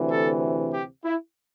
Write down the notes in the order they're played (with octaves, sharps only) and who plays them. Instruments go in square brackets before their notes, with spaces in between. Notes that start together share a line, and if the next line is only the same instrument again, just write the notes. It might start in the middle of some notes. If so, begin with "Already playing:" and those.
Already playing: [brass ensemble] D2 C3 E3
A4
G4
E4